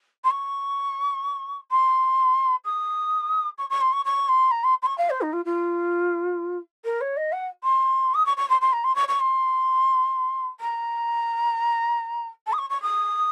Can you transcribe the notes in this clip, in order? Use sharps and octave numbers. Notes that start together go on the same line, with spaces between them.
C6
C#6
C6
D#6
C#6
C#6
C6
C#6
C#6
C6
A#5
C6
C6
C#6
F5
C5
D#4
F4
F4
A#4
C#5
D#5
F#5
C6
D#6
C#6
C#6
C6
C6
A#5
C6
C#6
C#6
C6
A#5
A5
D#6
C#6
C#6
D#6